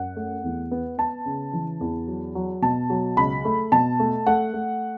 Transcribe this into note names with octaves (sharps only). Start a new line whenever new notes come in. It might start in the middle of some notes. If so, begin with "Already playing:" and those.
Already playing: F#2 F#5
A3
E2
B3
B3 A5
C#3
E3
E2
F#3
F#3
B2 A5
F#3
C#2 B5
A3
B2 A5
A3
A3 F#5
A3